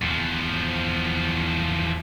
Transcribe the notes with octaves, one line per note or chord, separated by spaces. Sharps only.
E2 F3